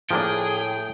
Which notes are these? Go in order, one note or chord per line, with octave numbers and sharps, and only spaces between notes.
A2 F3 A#3 D4 G#4 G5